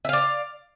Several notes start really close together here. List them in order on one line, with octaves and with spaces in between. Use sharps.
E5 F5 D5